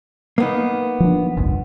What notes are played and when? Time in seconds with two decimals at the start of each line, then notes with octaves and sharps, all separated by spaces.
0.38 A#3 B3 D#4
1.00 F3 D4
1.37 G1 C2 F2